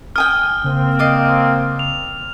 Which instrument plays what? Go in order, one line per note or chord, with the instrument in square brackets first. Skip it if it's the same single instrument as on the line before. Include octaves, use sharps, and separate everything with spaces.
[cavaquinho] G5 G#5 D#6 [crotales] F6
[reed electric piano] C#3 [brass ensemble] A#3 C4
[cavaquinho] D5 D#5 F5
[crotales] F7